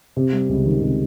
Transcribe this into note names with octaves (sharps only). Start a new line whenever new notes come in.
C3
G3
C#2
D#3
C3